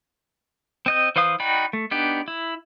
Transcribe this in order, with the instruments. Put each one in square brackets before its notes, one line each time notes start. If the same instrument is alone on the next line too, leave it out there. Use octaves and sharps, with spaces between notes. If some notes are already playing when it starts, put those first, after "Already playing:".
[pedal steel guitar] C4 D#5 G6
E3 B4 C5 F5 D#6
D#4 F#4 D5 G5 B5
A3
B3 D4 D#4 G4 D5
E4